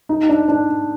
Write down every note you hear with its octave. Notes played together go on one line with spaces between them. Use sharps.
D#4
D4
D4